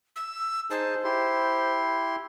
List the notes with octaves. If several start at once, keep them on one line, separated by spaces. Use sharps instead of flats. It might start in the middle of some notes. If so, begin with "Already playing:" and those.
E6
D#4 G#4 C5 A5
E4 G4 C6